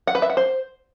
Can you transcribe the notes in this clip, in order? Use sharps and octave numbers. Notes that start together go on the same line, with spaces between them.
F#5
B4
E5
F#5
C5